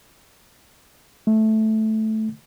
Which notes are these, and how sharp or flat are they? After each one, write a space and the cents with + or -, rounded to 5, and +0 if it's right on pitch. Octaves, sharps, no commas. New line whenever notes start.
A3 -10